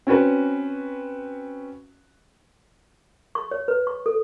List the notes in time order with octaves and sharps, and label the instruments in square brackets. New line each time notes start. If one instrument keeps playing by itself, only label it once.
[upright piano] C4 C#4 F#4 B4
[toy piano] C#6
C#5
B4
C#6
A4